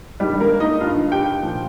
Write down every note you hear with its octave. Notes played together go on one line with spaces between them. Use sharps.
G2 D#3 G3 G4
A#3 A#4
D#4 D#5
G2 D#3 F4 F5
G4 G5
A#2 F3